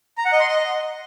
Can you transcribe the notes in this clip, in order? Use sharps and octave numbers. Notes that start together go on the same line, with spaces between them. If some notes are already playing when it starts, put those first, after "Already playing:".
A#5
F#5
D#5
C6
D#5